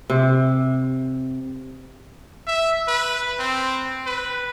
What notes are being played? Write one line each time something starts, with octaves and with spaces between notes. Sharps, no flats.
C3
E5
B4
C4
B4